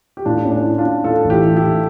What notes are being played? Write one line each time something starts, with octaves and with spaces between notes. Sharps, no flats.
G4
A2 D4 F4
C#4
D4
E4
D4 F4
C#4
A2 F4 A4
A1
E4 G4
E3
E4 G4
A2